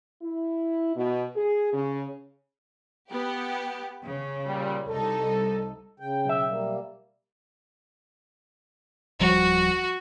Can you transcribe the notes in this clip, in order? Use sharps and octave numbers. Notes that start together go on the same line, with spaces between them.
E4
B2
G#4
C#3
B3 G4
C#3
A#2 G3
C2 D#4 A4
C#3 G5
B1 E5
G3 A#3
D1 F3 G3 F#4